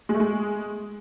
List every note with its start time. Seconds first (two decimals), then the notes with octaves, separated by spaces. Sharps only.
0.09 G#3
0.14 A3
0.20 G#3